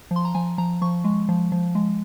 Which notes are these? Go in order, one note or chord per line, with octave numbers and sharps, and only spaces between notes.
F3
C6
A#5
F3 G#5
F3 A#5
F3 C#6
G#3
F3
F3
G#3